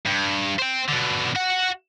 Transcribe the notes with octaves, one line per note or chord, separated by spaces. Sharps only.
G2
C5 G5
B2 D3
F#4 F#5